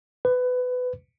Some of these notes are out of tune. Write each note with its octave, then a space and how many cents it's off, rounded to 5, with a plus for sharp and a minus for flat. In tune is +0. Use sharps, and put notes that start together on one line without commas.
B4 +20